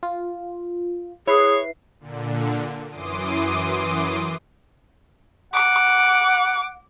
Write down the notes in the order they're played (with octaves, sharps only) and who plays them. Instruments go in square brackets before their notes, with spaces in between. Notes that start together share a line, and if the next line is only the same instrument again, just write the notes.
[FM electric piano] F4
[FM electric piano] E4 B4 C7 [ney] G#4 [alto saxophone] C#5
[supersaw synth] A#2 D3
F#2 E3 C6 D6 D#6 D#7
[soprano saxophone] F#5 [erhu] D6